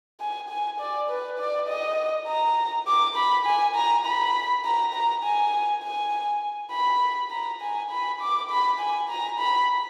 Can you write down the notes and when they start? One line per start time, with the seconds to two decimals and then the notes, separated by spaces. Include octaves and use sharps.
0.20 G#5
0.49 G#5
0.80 D5
1.09 B4
1.39 D5
1.68 D#5
2.28 A#5
2.87 D6
3.16 B5
3.46 G#5
3.75 A#5
4.06 B5
4.65 A#5
4.94 A#5
5.24 G#5
5.84 G#5
6.72 B5
7.31 A#5
7.62 G#5
7.91 B5
8.21 D6
8.50 B5
8.80 G#5
9.09 A#5
9.39 B5